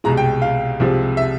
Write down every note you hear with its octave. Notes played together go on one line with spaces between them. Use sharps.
C2 B2 G#3 A#5
G5
F5
C2 C3 F3 G#3
E5